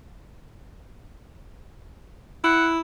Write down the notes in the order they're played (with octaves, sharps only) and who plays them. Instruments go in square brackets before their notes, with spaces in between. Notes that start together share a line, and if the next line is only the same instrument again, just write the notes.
[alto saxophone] E4 [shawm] F#5